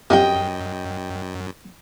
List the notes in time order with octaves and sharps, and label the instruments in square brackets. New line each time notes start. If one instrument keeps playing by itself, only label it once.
[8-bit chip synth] F#2 [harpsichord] C3 F3 [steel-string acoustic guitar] D#5 G5